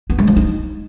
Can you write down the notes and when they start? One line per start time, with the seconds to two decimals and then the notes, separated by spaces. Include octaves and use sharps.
0.10 B3
0.19 G#3
0.27 F3
0.36 D#4